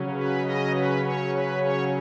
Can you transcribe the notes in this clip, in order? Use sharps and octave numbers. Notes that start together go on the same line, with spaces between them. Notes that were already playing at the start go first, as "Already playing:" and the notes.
Already playing: C#3 F#3 C#4
B4
D#5
B4
C#5
B4
C#5